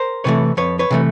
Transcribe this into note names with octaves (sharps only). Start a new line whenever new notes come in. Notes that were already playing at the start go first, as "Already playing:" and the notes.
Already playing: A#4 C5
C3 E3 A3 B4 C#5
F2 B4 C#5
B4 C#5
C3 E3 A3